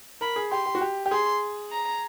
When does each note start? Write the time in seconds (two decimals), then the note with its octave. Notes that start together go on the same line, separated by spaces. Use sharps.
0.21 A#4 B5
0.36 G#4
0.51 G4 C6
0.66 G4
0.75 F#4
0.81 G4
1.06 G4
1.11 G#4 C6
1.72 A#5